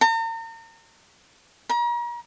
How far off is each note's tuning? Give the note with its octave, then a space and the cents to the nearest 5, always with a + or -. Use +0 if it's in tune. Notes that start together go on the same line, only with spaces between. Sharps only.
A#5 -40
A#5 +40